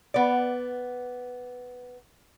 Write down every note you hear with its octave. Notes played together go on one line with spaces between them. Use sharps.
B3 D5